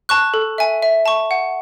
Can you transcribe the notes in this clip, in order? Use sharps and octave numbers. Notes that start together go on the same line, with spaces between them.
A5 C#6 F#6
A4
E5 G#5
E5
A5 C#6
F#5